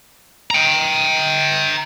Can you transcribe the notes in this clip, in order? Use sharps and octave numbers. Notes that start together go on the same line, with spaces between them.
G5 A#5